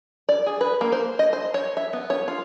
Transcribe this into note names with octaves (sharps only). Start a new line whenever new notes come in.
D5
G#4
B4
A#3
C5
D#5
C5
C#5
E5
B3
C#5
F4